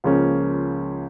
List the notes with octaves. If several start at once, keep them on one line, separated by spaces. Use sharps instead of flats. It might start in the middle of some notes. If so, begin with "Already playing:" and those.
C#2 C#3 F3 A#3 C#4